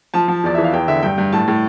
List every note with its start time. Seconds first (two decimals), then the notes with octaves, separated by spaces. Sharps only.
0.14 F3 A5
0.28 F3
0.44 E2 D5
0.55 E3 E5
0.64 F5
0.73 E2 G5
0.88 D3 E5
1.03 G2 G5
1.18 G2
1.33 A2 A5
1.48 A2